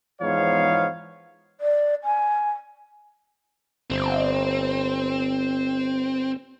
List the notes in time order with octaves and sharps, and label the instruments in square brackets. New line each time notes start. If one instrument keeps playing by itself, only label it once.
[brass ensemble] E2 G#2 F3 B3 C#5 F5
[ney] D5
G#5
[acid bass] G1 [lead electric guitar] C4